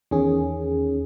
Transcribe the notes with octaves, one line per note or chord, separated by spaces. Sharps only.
E2 D#3 C#4 G#4